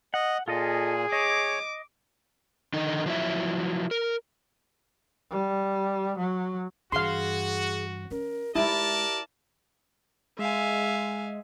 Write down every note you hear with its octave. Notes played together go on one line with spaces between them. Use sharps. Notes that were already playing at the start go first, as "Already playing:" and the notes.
D#5 F#5
A#2 F4 G#4 A4 D#5
C#5 D#5 D6
D3 D#3 D#4
F3 F#3 E4 E5
A#4
G3
F#3
G2 E3 F#4 G#4 F5 C6
C#4 A#4
G#3 D#4 E4 G4 A#4 D5 A5
G#3 E5 F5 G#5